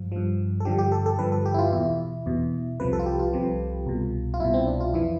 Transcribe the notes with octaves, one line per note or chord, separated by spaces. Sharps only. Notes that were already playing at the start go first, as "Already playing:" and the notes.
Already playing: G2 F3
G2 F3
A4
G2 D3 F3 G4
G4
A4
A4
G2 D3 F3 B4
A4
G4
E4
F4
E2 B2 E4
E2 B2
C2 C3 F3 B4
A4
F4
G4
F4
C2 C3 F3
C2 B2
F4
C2 B2 E4
C4
D4
F4
F2 E3 E4